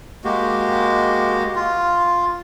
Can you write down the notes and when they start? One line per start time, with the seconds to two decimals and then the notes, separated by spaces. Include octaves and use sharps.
0.24 G#3 A#3 F#4 G4
1.55 F4